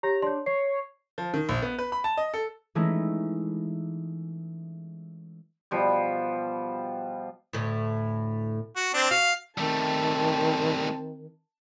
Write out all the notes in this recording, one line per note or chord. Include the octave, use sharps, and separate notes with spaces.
G4 C#5 A#5
D4 C#5 C6
C#5 C7
F3
D#3
A#1
B3
B4
B5
A5
D#5
A4
E3 G#3 A3 C#4 D#4 E4
B2 F3 G3
D2 A2
F#4
C4 D4
F#4 F5
D#3 G3 A3 C4 A5